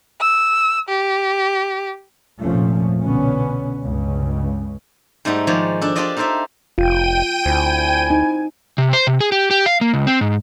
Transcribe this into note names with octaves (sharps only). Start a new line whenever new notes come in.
E6
G4
F1 A#2 F3 A3 C#4
C2 B2 D3 B3 C#4
C#2 G2 C#3 C#4
G#2 G3 A3 D#4 A4 F#5
D#3 F3 G#3 C#5 D5
D4 A4
D4 F4 G4 C5 D5 D#5
D#4 A4 A#4 C5 D5 E5
F1 F4 G5 D#7
D2 C4 E4 G#5
D#4
C3
C5
C3
G#4
G4
G4
F5
A#3
C#2
C4
G#2